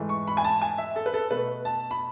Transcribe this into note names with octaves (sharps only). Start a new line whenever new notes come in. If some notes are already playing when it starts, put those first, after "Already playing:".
Already playing: G#2 E3 A3
C#6
B5
G#5
A5
G#5
E5
A4
B4
A4
B2 A3 B4
A5
B5